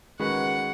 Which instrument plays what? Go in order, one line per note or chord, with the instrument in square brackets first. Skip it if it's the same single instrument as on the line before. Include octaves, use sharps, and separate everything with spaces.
[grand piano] D#3 G#3 C#4 F#4 B4 [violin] F#5